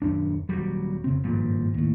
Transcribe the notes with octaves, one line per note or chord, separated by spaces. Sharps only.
D#1 F#2 D4
D#1 B1 F#3 G3
F1 C#3 C4
G#1 G2 A#2 F3
D#2 A2